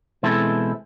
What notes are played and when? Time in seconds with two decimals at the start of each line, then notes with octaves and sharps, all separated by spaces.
0.23 B2 E3 G#3 C4 E4 A4